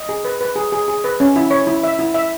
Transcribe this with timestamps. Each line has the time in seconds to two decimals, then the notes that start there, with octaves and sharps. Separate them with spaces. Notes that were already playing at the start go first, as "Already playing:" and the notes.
Already playing: D#5
0.09 G#4
0.25 B4
0.41 B4
0.56 G#4
0.72 G#4
0.88 G#4
1.04 B4
1.20 C#4
1.36 E4
1.51 C#5
1.67 E4
1.84 E5
1.99 E4
2.14 E5